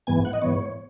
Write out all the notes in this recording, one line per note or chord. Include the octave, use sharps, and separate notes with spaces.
G#2 E3 B3 G#5
F#5
D#5
G#2 E3 B3 C#5